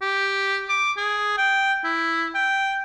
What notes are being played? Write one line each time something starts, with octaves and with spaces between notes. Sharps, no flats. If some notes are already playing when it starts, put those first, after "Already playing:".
G4
D6
G#4
G5
E4
G5